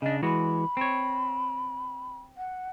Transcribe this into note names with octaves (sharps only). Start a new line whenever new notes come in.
C#3 D4 D#5
E3 G#3 F#4 B5
C4 C#5
F#5